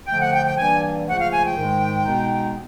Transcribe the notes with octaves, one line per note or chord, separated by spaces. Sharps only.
D3 F3 A3 G5
F#5
G5
G5
G2 E3 G3 A#3 D4 G#5
C#2 C#3 F3 A3 F#5
F5
G#5
G5
G#2 D#3 G#3
B2 G#3 B3 D#4